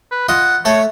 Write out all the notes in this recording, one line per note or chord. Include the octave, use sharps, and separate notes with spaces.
B4
F4 D#5 F#5
A3 A4 C#5